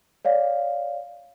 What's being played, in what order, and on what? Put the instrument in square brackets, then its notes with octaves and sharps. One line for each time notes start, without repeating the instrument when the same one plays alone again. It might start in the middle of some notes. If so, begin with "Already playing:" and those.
[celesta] C#5 D5 F5